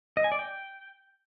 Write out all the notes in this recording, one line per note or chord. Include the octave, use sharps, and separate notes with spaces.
D#5
G#5
D5
G5